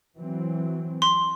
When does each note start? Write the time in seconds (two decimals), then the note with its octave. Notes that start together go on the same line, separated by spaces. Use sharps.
0.16 E3 F#3 C4
1.02 C6